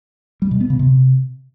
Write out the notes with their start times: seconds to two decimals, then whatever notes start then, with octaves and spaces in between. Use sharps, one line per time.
0.42 G3
0.51 B2
0.61 B3
0.70 C#3
0.79 C3